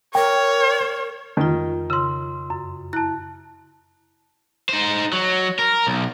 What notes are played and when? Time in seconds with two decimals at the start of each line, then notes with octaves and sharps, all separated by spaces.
0.15 A#4 C#5 G5
1.37 F2 D#3 F4
1.90 C#3 C6 E6
2.50 F#2
2.93 E4 A5 F#6
4.69 D#4 C5
5.12 F#3
5.59 A#4
5.87 B1